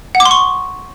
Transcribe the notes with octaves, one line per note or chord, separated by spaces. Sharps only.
F#5
D6
C6
C#6